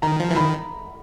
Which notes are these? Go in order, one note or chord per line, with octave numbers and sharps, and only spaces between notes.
D#3 A#5
F3
E3
D#3 B5